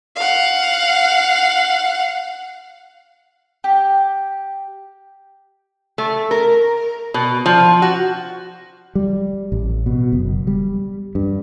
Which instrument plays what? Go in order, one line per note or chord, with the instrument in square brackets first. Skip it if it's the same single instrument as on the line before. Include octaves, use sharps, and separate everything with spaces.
[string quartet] F5 F#5
[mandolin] G4
[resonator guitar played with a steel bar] A3
A#4
B2
F3
F#4
[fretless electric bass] G3
A1
B2
F#1
G3
G2